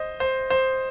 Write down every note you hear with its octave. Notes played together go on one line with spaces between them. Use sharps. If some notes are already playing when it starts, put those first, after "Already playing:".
Already playing: C5 D#5
C5
C5